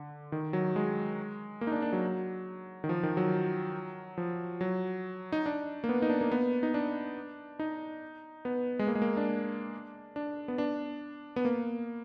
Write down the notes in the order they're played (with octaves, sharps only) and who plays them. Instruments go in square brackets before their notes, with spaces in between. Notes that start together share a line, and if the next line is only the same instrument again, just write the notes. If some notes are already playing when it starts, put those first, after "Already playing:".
Already playing: [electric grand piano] D3
D#3
F#3
G#3
A#3
D#4
D4
D4
F#3
D#3
F3
D#3
F#3
F3
F#3
D#4
D4
A#3
B3
D#4
D4
A#3
B3
D#4
D4
D#4
B3
G#3
A#3
G#3
A#3
D4
D4
B3
D4
B3
A#3